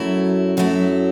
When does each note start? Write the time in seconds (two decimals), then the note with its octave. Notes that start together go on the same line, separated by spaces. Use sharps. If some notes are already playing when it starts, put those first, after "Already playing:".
Already playing: F#2 F#3 A3 E4
0.57 F#2 F#3 A3 E4